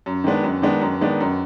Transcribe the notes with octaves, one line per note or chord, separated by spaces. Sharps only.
F#2
D#3 G#3 B3 D4
F#2
D#3 G#3 B3 D4
F#2
D#3 G#3 B3 D4
F#2